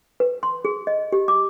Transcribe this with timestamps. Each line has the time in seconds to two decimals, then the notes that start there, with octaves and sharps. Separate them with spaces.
0.20 B4
0.43 C6
0.65 G#4
0.87 D#5
1.12 G4
1.28 D6